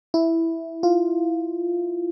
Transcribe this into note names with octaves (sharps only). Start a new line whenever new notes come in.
E4
F4